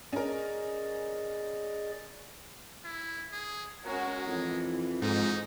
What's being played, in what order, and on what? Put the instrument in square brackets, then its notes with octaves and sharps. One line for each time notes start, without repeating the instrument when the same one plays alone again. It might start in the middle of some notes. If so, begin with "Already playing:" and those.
[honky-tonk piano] C#4 A#4 [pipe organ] G#4 D5 D#5
[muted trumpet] E4
G#4
[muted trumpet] G#3 [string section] C#4 F#4 A#4
[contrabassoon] F2 [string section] E3
[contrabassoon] F2 [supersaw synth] G#2 [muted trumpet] D#4